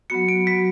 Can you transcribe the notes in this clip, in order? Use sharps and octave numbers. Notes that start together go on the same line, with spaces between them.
F#3 B3 F#4 C#7
D7
F#3 B3 F#4 B6